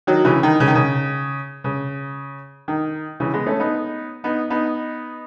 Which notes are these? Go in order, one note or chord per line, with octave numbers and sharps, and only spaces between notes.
D#3 F#3
C#3 E3
D#3
C#3
D#3
C#3
C#3
D#3
C#3 E3
G#3 B3
A3 C#4
B3 D#4
B3 D#4
B3 D#4